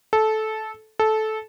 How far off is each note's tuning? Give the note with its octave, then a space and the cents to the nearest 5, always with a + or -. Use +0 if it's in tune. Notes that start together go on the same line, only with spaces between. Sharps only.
A4 -15
A4 -15